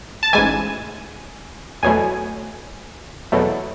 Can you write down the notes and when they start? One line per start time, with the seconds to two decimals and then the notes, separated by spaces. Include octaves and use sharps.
0.23 A5
0.33 A1 G#2 E3 G#5
1.83 E2 B2 F#3 A3 G#5
3.32 E2 B2 F#3 A3